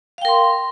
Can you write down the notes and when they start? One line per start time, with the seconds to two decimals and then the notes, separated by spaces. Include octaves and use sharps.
0.18 F5
0.22 G5
0.25 A#4
0.28 C6